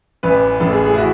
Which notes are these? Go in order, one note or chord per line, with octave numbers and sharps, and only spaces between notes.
A1 A2 E3 B4
A1 A2 E3 A4
G#4
G#4
E4
F#4